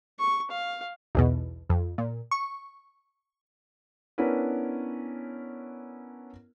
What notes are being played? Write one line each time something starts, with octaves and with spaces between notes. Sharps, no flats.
C#6
F5
B1 E2 B2
F2
A#2
C#6
B3 C#4 D4 E4 A#4 B4